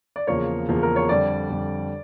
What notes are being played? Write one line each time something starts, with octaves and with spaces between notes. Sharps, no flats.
D5
E2 C#3 F3 A#3 C#5
E2 C#3 F3 A#3
A#4
C#5
F2 D3 G3 D5
F2 D3 G3